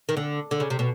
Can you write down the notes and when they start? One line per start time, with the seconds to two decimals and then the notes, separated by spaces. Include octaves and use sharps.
0.09 D#3
0.17 D3
0.51 D3
0.60 C#3
0.70 C3
0.79 B2